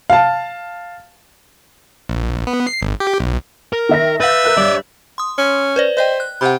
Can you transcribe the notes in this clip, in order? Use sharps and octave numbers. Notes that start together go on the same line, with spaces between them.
F5 A5
A#1
B3
C7
G#1
G4
B1
A#4
D#3 E5 A#6
B4 E5 F5 G6 A6
A#4 F#6 G6
G2 C#5 D5
C6 D#6
C#4
B4 C5 D5
C5 D5 D#5 G5
F#6
C3 F#5 B5